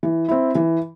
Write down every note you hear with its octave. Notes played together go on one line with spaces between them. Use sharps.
E3
C4 E4
E3